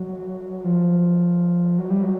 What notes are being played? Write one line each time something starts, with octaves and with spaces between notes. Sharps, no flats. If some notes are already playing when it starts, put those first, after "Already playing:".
Already playing: F#3
F3
F#3
G3
F#3